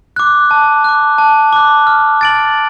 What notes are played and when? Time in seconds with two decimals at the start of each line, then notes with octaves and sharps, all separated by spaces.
0.16 D6 F#6
0.51 A5
0.84 D6 F#6
1.18 A5
1.53 D6 F#6
1.87 F6
2.21 A6 D7 F#7